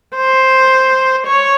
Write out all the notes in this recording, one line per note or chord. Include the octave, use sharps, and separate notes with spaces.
C5
C#5